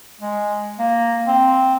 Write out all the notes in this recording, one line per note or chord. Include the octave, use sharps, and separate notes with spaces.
G#3
A#3
C4